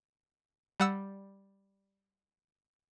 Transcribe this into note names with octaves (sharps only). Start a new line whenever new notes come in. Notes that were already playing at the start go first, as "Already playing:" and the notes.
G3 F#5 E6